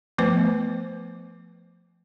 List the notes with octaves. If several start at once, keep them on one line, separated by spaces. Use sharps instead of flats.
F3 A3 B3 B4 C5